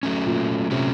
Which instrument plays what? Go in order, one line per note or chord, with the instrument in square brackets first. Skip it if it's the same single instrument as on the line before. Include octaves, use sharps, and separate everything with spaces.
[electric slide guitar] F#3 A3 C#4
[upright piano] A#2
[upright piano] C3 [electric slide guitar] F#3 A3 C#4